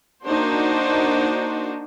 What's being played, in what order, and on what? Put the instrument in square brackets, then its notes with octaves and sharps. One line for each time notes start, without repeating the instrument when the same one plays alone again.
[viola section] A#3 D4 D#4 F#4 C5